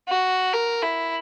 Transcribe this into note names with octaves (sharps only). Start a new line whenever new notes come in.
F#4
A#4
E4